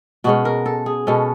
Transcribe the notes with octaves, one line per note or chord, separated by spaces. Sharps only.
B2 G#3 C#4 F#4
A#4
A4
G#4
B2 G#3 C#4 A4